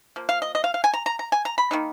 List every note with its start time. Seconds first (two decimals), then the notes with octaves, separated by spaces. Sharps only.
0.16 F3 A#3
0.29 F5
0.42 D#5
0.55 D#5
0.64 F5
0.74 F5
0.84 G#5
0.94 A#5
1.06 A#5
1.19 A#5
1.32 G#5
1.45 A#5
1.58 B5
1.71 D#3 A#3 D#4